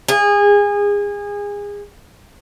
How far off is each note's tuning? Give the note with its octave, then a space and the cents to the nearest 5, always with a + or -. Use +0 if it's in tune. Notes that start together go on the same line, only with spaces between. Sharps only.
G#4 -25